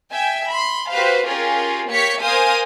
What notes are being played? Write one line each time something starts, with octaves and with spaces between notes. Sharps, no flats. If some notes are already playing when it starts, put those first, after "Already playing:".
E5 G5 G#5
B5 C6
F#4 G4 B4 C5 F5
C#4 F4 G4 G#4 A#4
A#3 G4 C#5 B6 C#7
A#4 C5 F5 G#5 D#6